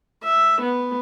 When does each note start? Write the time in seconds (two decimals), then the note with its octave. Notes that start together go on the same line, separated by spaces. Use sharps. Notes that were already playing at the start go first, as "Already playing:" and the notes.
0.24 E5
0.61 B3